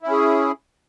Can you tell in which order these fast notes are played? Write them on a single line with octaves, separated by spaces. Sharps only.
E4 C#4 G#4